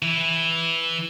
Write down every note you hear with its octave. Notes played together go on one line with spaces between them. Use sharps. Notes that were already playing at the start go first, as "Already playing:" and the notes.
E3 E4